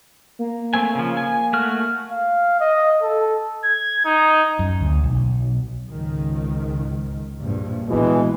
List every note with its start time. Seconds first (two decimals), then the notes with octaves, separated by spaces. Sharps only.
0.39 A#3
0.74 A3 C4 G#5
0.95 C#3 F3
1.17 G#5
1.53 A3 F#4 F6
2.12 F5
2.61 D#5
3.03 A4
3.64 G#6
4.05 D#4
4.59 F#2
4.81 D2
5.04 B1
5.88 C#2 G#2 D#3
7.39 A#1 G2 A#2
7.89 A#1 E2 B2 E3 G#3